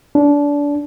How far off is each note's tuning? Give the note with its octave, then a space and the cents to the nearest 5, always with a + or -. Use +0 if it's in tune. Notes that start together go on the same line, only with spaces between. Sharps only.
D4 -25